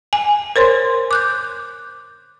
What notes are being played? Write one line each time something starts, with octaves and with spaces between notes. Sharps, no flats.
G#5
A#4 C5 C#5 C6
D6 F#6 G6